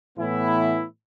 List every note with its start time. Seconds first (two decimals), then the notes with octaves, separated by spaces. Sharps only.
0.17 A2 E3 B3 E4